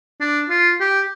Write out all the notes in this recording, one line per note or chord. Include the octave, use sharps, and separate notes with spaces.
D4
F4
G4